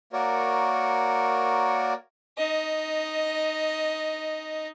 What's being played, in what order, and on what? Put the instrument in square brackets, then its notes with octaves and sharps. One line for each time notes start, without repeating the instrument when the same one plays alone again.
[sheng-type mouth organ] A#3 F#4 A#4 C#5 D5
[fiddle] D#4 D#5